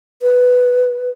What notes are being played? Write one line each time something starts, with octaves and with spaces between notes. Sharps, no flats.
B4